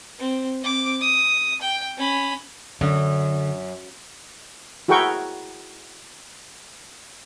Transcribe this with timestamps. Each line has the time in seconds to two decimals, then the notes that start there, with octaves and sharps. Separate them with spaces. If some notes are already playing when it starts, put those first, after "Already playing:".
0.19 C4
0.62 C4 D6
1.01 D#6
1.61 G5
1.98 C#4 B5
2.81 F#2 D3
4.88 E4 F#4 G#4 A#4 G5 C#6